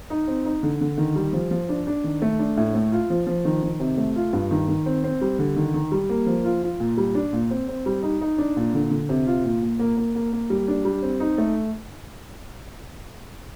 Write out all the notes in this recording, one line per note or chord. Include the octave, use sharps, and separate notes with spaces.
D#4
C4
D#4
D3
D3
D#3
G3
F3
F3
D4
D4
D#3
A3
D4
A2
A3
F4
F3
F3
D#3
D#3
C3
A3
F4
G2
D#3
D#3
C4
C4
G3
D3
D#3
D#3
G3
A#3
F3
F4
F4
A#2
G3
D4
A#2
C4
C4
G3
D#4
D#4
D4
A#2
D3
D3
C3
F4
A#2
A#2
A#3
A#3
A#3
A#3
G3
D4
G3
C4
D#4
A3